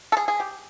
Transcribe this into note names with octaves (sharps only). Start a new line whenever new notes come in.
A4
G#4
G#4
G4